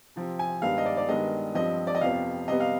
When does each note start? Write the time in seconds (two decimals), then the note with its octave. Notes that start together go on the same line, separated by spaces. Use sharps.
0.16 C3 F3 C4
0.39 G#5
0.62 G2 D#3 G#3 B3 F5
0.78 D#5
0.86 D5
0.97 D5
1.09 G2 D#3 G#3 B3 D#5
1.55 G2 F3 C4 D#5
1.87 D5
1.95 D#5
2.01 F2 C3 F3 B3 F5
2.48 C3 G3 B3 D#5
2.60 F5